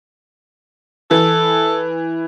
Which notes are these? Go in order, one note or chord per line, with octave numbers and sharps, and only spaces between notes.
E3 A4